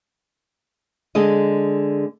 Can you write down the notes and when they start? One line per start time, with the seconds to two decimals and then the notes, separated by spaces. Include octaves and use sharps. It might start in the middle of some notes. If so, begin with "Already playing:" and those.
1.15 D3 G#3 D#5